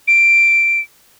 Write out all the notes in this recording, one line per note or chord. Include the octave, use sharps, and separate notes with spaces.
D7